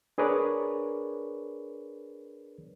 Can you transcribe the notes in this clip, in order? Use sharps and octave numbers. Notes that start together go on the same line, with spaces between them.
D4 G#4 A#4 B4 C#5 D5